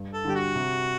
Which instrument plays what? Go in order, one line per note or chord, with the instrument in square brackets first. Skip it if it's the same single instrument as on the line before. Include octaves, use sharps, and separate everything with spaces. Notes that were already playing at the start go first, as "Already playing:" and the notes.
Already playing: [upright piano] G2
[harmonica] A4
[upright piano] D3 G3 [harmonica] G4
[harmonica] F#4
[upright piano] C3